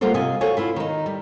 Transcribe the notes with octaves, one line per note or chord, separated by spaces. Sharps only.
G3 A#3 F4 F#4 A4 C5
C3 F4 D#5 G#5
F#4 A4 C5 C#5 F5 G#5
E4 F4 B4
D#3 D#4
G3